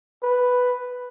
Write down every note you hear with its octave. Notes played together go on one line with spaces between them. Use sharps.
B4